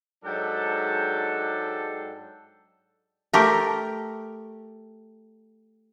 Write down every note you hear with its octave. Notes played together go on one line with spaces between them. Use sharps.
G#2 F#3 G#3 D4 A4 G5
A3 G4 A#4